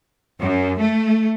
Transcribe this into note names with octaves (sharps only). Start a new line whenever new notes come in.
F#2
A3